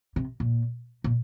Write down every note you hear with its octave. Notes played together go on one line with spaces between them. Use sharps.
C3
A#2
A#2